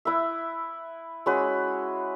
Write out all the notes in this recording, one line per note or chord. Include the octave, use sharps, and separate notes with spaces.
E4 B4 E5
G#3 C#4 F#4 B4